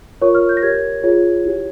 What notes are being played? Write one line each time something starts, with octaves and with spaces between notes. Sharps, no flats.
F4 A#4 C#5 C#6
F6
G6
A#6
G4 A#4 C#5 G#6
F4 G#4 C#5
E4 G4 C#5